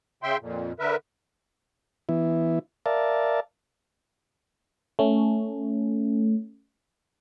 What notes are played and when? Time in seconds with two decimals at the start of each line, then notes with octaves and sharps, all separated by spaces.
0.23 C#3 E5 G5 C6
0.41 F2 A#2
0.79 D3 A#4 B4 E5
2.09 E3 B3 E4
2.86 A#4 D5 E5 F5 A5
4.99 A3 C#4